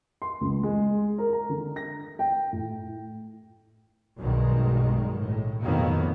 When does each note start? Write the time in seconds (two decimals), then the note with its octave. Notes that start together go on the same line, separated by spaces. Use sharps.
0.22 C6
0.41 C#2
0.63 G#3
1.18 A#4
1.33 A#5
1.49 D3
1.76 A#6
2.19 G5
2.52 A2
4.18 B1 G2 B2 D#3 G#3
5.19 A2
5.61 F2 D#3 F#3 A#3 B3